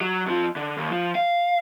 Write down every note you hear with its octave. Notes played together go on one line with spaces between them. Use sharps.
F#3
F2 F3
D3
D#2
F3
F5